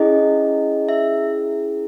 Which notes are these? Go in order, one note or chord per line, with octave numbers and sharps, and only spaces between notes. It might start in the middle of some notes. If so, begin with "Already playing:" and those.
Already playing: C#4 E4 G#4 D#5
E5